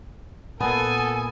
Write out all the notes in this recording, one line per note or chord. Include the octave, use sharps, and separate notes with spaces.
A#2 A#3 B3 A4 G#5